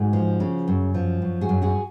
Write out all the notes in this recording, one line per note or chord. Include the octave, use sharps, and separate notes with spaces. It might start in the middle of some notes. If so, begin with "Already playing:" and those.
Already playing: G#2 F#4 G#4
F3
C#3
F#2
F3
F#2
F#4 G#4
F#2
F#4 G#4